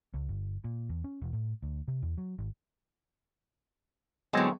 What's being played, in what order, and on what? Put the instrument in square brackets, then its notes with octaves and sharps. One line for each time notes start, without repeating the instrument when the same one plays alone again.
[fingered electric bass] C#2
G1
A#2
E2
C#4
E1
A2
D2
C3
E2
F#3
G#1
[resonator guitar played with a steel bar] A2 D3 [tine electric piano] F#3 B3 [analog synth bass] G#3 [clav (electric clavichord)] C4 D#5 G#5